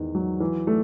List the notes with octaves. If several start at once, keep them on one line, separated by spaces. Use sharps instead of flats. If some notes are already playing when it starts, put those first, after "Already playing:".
Already playing: E2 D#3
F#3
E3
A3